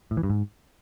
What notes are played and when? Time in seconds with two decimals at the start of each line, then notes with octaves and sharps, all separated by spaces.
0.11 A2
0.17 E3
0.23 G2
0.30 G#2